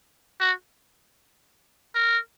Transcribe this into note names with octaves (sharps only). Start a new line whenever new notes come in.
F#4
A#4